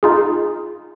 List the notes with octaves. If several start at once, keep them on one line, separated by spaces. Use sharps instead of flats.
D#4 F4 G#4